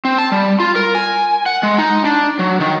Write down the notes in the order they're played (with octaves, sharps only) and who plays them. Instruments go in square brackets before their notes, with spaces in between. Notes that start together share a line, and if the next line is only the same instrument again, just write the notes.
[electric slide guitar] C4
A5
G3
F4
A#4
G#5
F#5
G#3
D#4
D4
F#3
D#3